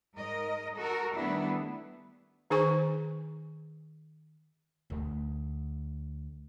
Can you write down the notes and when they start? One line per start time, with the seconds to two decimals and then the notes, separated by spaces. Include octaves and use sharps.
0.14 G#2 A#4 D#5
0.77 F#4 A4 A#4
1.16 D#3 G3 A3 B3 D4 E4
2.50 D#3 D#4 G#4 C5 G#5 C#6
4.90 D2